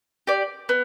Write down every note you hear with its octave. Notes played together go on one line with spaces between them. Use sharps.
G4 D5
B3